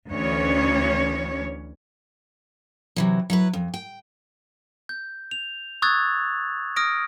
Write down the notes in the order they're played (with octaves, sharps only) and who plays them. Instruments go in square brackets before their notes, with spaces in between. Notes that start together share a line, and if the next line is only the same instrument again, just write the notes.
[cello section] D2 E3 C#4 C#5
[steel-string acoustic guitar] C3 E3 F#3
F#3 E4 B4
F2
G5
[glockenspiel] G6
F7
C#6 D#6 E6 F#6 G#6 A6
D#6 F6 A#6 D7